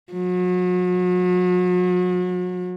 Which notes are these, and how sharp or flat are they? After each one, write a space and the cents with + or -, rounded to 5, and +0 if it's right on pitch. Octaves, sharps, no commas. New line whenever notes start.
F#3 -40